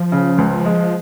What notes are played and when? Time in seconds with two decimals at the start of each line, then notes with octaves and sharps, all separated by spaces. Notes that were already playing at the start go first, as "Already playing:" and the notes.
Already playing: F3
0.12 C#3
0.38 C#2
0.65 G#3